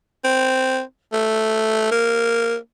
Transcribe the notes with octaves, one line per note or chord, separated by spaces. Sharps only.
C4
A3
A#3